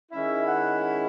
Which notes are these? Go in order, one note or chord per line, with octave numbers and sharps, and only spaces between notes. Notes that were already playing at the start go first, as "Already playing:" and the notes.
D#3 G#3 C#4 E4 E5
F#5